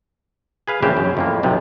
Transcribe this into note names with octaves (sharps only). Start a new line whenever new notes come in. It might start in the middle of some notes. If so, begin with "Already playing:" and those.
G#4 B4 F5
A#1 C#3 E3 G4 C5
F#2
F2 A2 A#3
B1 C3 F3